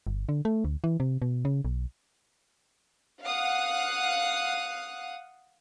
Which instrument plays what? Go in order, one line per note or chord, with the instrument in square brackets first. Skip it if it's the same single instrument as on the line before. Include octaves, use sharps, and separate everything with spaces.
[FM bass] G1
D3
A3
D2
E3
C3
B2
C#3
B1
[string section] F5 F#5 D#6 F#6